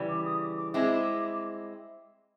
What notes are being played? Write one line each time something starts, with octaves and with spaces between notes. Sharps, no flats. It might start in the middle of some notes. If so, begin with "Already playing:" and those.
Already playing: C#3 E3 G3
D6
D#6
D6
D6
G#3 C4 E4 D6